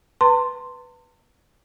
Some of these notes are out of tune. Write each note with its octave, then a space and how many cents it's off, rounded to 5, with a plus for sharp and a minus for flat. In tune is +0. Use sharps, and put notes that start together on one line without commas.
B4 +0 A5 +45 C6 +0